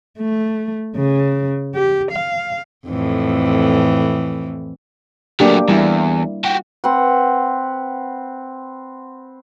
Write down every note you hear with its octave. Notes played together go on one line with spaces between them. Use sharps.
A3
C#3
G4
F5
F2 A2 E3
F#3 A3 A#3 D4 G4
E2 G3 E4
F#4 G4
C4 B4 F#5